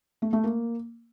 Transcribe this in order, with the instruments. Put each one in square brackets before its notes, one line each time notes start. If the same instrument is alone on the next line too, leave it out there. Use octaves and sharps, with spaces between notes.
[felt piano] A3
A3
A#3